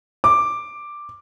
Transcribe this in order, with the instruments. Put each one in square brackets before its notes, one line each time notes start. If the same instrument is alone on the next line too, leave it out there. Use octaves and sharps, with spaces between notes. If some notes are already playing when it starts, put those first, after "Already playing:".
[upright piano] D6